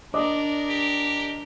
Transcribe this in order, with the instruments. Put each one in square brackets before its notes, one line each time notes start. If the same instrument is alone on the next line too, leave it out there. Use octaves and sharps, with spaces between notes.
[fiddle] D4 A#4 [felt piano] D5 D#5 D6
[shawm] G4